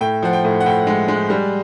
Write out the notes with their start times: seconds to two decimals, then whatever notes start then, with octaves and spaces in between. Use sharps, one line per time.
0.01 A2 G5
0.23 F3 F#5
0.33 G5
0.44 A2
0.60 F#5
0.66 A2 G5
0.87 G#3
1.08 G#3
1.30 G3